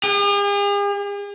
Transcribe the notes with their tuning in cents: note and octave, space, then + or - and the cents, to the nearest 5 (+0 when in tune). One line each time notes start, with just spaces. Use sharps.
G#4 -45